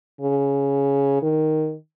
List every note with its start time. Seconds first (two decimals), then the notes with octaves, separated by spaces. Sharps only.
0.21 C#3
1.22 D#3